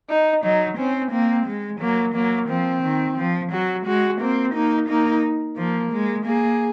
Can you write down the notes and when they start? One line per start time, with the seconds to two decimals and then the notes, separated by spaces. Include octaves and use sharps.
0.10 D#4
0.43 F#3 D#4
0.78 C4 C#4
1.12 A#3 C4
1.46 G#3
1.81 F#3 A#3
2.15 F#3 A#3
2.49 F3 C4
2.83 D#3
3.18 F3
3.52 F#3 F#4
3.86 G#3 F#4
4.20 A#3 C4
4.55 A#3 D#4
4.89 A#3 D#4
5.57 F3 A#3
5.92 G#3
6.26 A#3 G#4